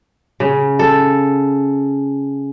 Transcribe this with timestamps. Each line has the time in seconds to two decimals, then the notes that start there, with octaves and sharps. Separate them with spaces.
0.40 C#3
0.79 A4